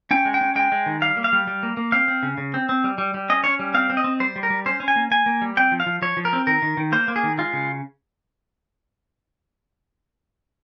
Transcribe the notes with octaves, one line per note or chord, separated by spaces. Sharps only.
C#4 G5
G#3
G5
C#4
G#3 G5
G#3
D#3
G3 F5
A#3
F5
G3
G3
A#3
A#3
C4 F5
C4
C#3
C#3
C4
C4
G3
G3
G3
C#4 D#5
C#4 C#5
G3
C4 F5
C4
D#5
C4
G3 C5
G3
A#4
G3
C#4 C5
C#4
G#5
A#3
A#3 G#5
A#3
G3
C4 G5
F3
F5
F3
F3 C#5
F3
A#4
C4
D#3 A#4
D#3
D#3
A#3 C5
A#3
G#4
D#3
G#3 F4
C#3